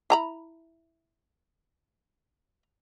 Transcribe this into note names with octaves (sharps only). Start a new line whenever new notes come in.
E4 A#5 B5